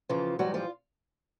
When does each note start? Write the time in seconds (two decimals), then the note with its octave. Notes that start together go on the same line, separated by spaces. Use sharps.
0.09 F2 C#3 E3 F3 F4
0.39 G#2 E3 F#3 G3 F#4
0.54 F3 F4